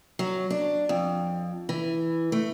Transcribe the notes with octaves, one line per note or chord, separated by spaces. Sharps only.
F#3
D4
F2
E3
A3